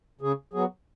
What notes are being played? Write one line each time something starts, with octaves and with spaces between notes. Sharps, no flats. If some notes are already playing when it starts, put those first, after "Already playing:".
C#3 G#4
F#3 B3 G#4